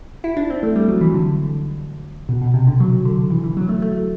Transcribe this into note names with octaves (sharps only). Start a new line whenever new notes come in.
E4
D4
C4
A3
G3
F#3
E3
D3
B2
B2
C3
D3
F#3
D3
E3
E3
F#3
A3
A3